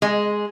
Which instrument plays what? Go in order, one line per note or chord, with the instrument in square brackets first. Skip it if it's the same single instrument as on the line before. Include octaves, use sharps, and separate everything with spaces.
[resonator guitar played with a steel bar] G#3